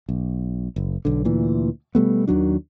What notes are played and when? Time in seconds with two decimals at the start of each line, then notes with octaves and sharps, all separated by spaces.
0.09 B1
0.76 F#1
1.05 B1 D3
1.25 D2 A#2 E3
1.95 B2 G3 A3 B3
2.28 D#2 D#3 F#3 D4